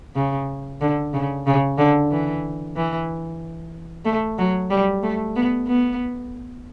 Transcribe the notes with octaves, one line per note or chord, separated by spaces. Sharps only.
C#3
D3
C#3
C#3
D3
E3
E3
A3
F#3
G3
A3
B3
B3